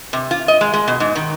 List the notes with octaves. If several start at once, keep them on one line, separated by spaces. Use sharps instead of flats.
C3
F4
D#5
G#3
G#3
B2
G#2
D#3